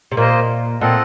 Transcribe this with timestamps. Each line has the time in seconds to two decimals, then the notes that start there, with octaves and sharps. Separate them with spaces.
0.11 C3
0.17 A#2 A#3 F4 C5 D#5
0.81 A#2 C4 F4 A4 D#5 F#5